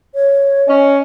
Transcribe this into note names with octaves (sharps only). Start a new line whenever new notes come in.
C#5
C#4 D#5